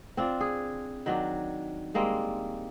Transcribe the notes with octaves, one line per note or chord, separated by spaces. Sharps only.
C4 D4 F4
G#4
D#3 F#3 D4
G3 G#3 A#3 C4